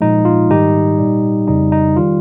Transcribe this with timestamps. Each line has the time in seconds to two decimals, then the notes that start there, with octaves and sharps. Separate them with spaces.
0.01 A#2 F3 G#3 D#4
0.25 F4
0.50 G#2 D#3 G3 D#4 G4
0.98 A#2 G3
1.48 F2 C#3 G3 D#4
1.72 D#4
1.97 D#3 G3 F4